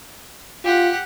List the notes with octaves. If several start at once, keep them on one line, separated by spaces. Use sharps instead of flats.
F4 G4 F#5